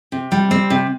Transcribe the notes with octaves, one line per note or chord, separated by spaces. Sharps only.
C3
G3
C4
C3